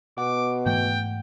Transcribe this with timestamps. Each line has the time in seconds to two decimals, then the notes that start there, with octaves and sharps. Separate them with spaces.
0.18 B2 F#5 D6
0.66 G#2 E3 A3 G5